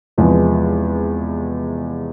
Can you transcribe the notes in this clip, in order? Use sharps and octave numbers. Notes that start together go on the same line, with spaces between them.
E2 C3 F3 G#3 B3